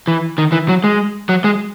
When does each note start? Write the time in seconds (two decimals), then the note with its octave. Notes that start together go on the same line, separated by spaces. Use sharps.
0.07 E3
0.38 D#3
0.52 E3
0.69 F#3
0.84 G#3
1.29 F#3
1.44 G#3